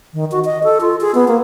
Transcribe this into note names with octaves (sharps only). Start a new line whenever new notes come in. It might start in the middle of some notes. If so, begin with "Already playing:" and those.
D#3
F#4
D#5
A4
F4
G#4
B3
A#3